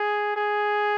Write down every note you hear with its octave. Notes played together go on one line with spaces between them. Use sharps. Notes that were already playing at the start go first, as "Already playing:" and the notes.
Already playing: G#4
G#4